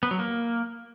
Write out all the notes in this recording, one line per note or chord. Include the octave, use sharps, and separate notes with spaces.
B3
F#3
A#3